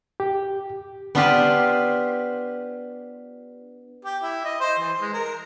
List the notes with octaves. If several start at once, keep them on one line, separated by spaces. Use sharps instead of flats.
G4
B3 D4 F4 G4 B4 C5
G4
E4
D#5
C5
E3
G#3
A#4